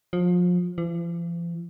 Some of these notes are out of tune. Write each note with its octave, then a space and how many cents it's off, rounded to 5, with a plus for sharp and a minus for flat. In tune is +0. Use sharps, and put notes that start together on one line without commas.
F3 +30
F3 -45